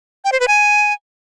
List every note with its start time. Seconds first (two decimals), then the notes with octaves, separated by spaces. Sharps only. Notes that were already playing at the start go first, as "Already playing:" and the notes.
0.25 G5
0.32 C5
0.40 B4
0.48 G#5